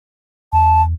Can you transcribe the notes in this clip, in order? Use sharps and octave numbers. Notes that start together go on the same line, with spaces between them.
E2 A5